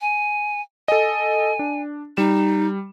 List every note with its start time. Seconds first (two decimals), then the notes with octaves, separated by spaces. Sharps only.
0.01 G#5
0.88 A4 D#5 G#5
1.59 D4
2.17 G3 D#4 E7